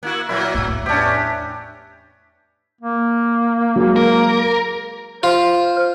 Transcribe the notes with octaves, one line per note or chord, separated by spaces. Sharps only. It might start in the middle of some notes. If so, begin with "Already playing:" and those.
A#3 E4 F#4
A#2 F#3 A#3 E4
E2 A2
B3 C#4 D4 G4
A#3
F#3 G#3
A#4
F4 C5 F6